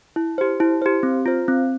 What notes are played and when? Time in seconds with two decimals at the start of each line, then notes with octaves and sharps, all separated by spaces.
0.16 E4
0.38 G4 C5
0.60 E4
0.82 G4 C5
1.03 C4
1.26 F4 C5
1.48 C4